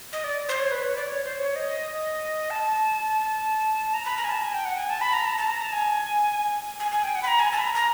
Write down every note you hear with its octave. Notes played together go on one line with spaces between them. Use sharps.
D#5
D5
C5
C#5
B4
C#5
D5
C#5
C5
C#5
D#5
A5
A#5
B5
A#5
G#5
A5
G#5
G5
F#5
G#5
A5
B5
A#5
A5
A5
A#5
A5
G#5
G#5
G#5
G5
F#5
B5
A#5
G#5
A5
B5
A#5
A#5